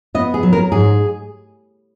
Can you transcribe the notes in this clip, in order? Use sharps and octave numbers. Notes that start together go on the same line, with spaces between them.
B3 D#5
G#4
F#3
A#4
G#2 G#4